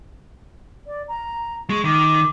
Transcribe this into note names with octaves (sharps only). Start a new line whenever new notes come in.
D5
A#5
G#3 C#6
D#3 D6